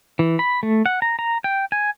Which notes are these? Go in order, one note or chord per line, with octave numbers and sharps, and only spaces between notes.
E3
B5
A3
F#5
A#5
A#5
G5
G#5